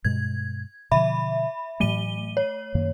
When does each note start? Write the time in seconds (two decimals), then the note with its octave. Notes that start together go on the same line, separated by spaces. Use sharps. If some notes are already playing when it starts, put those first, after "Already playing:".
0.05 G2 B2 G#3 G#6
0.92 B2 D3 F3 E5 B5
1.80 A2 E3 F#3 A3 D#7 G7
2.37 C#5
2.75 F#2 D#3 A#3